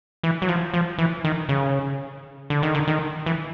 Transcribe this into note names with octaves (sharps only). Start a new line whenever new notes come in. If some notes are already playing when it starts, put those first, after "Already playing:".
E3
F#3
F3
F3
E3
D#3
C#3
D3
D#3
D3
D#3
E3